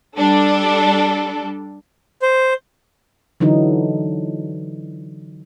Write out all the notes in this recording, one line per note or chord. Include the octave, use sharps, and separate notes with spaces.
G3 D4 A4
C5
D3 E3 F#3 D#4